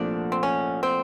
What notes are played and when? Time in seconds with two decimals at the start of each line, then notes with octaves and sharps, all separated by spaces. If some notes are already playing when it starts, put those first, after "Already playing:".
Already playing: C2 A#2 F3 A3 D4
0.32 C4
0.43 C#4
0.83 C4